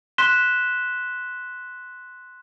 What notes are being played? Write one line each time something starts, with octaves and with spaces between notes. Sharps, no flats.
C6 F#6 B6 E7 G7